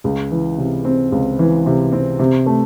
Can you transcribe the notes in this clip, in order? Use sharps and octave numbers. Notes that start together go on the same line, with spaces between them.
C#2
E3
C3
C4
C#2
E3
C3
C4
C3
A3